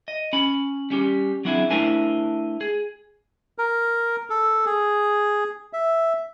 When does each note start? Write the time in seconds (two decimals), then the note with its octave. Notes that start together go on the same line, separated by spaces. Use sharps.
0.08 D#5
0.33 C#4 B5
0.90 G3 C#4 G4
1.45 F#3 C4 D4 E4 F#4 G#4
1.70 A3 D4 E4 A#4 C5 G#5
2.61 G#4
3.58 A#4
4.30 A4
4.66 G#4
5.73 E5